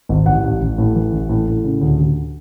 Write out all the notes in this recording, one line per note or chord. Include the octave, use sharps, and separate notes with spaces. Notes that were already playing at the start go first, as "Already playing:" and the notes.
G#1
A1 F#5
A1
A1
A2
E3
A1
A2
A2
C#3
D2
D2